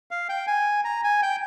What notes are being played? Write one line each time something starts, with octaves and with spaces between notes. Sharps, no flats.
F5
G5
G#5
A#5
G#5
G5